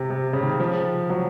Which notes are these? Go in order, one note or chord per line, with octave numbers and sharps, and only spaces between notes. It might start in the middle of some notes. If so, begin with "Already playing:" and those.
Already playing: C3
C3
C#3
D#3
F3
F#3